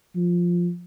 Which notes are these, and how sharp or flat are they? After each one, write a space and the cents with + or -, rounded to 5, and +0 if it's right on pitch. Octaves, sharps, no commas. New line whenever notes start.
F3 +5